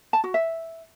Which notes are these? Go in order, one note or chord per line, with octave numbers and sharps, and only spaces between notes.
A5
F#4
E5